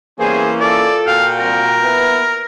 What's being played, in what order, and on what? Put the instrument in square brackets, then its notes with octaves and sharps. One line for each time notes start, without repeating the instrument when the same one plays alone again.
[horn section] E3 A#3 C#4 [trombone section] G3 B3 G#4 [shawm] C5
[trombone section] F4 A4 [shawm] D5
[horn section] A#2 F#4 G5 [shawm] F5
[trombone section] C2 [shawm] A#4
[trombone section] B3 E4 B4